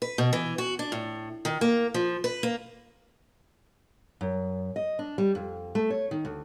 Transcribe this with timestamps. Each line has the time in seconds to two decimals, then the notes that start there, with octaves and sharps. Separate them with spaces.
0.02 B4
0.18 B2
0.33 E3
0.58 F#4
0.79 D4
0.92 A2
1.45 D#3
1.61 A#3
1.94 F3
2.24 B4
2.43 A#3
4.21 F#2
4.76 D#5
4.99 D4
5.18 G3
5.35 F2
5.75 A3
5.90 C#5
6.11 D#3
6.25 D2